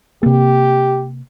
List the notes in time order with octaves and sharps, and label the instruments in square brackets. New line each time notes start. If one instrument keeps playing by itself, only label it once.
[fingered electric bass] C3 A#3 [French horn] G4